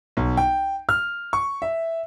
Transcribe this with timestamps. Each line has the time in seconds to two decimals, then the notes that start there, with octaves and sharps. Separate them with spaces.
0.17 B1
0.37 G5
0.89 F6
1.33 C#6
1.62 E5